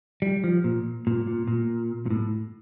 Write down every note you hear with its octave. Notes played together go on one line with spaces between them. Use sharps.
G3
F3
A#2
A#2
A#2
A#2
A#2
A2